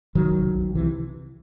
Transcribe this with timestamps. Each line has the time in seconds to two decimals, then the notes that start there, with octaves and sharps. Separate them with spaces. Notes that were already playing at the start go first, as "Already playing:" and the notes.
0.15 C3 D#3 F#3
0.30 C2
0.45 C2
0.61 C2
0.75 C3 E3